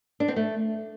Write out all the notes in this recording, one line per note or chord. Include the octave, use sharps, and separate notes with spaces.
D4
C4
A3